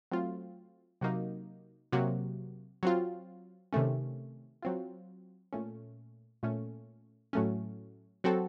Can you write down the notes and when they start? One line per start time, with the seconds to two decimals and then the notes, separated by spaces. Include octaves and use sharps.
0.12 F#3 A3 C4 F4
1.01 C3 F#3 A#3 D#4
1.92 C3 F#3 A#3
2.83 F#3 C4 F4
3.73 C3 D#3 A3 C#4
4.62 F#3 C4 F4
5.53 A#2 A3 C#4
6.43 A#2 A3 C#4
7.33 A2 F#3 A3 C#4
8.24 F#3 C4 F#4 A4